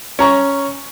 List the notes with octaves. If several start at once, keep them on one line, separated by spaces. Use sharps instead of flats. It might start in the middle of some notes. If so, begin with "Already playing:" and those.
C#4 A#5 C#6